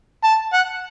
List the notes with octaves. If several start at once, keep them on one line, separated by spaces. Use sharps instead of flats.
A5
F#5